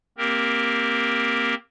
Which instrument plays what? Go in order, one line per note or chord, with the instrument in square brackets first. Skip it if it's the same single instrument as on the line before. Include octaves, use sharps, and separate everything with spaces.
[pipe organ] A#3 C4 G4 A#4